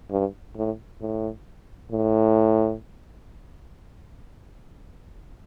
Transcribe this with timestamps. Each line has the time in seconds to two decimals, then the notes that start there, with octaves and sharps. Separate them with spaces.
0.11 G2
0.56 A2
1.01 A2
1.91 A2